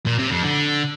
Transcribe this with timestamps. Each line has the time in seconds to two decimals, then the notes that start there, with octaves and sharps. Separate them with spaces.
0.07 A#2
0.19 C3
0.31 F2
0.43 D3